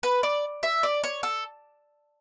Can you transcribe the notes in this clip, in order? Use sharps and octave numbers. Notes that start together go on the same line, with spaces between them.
B4
D5
E5
D5
C#5
A4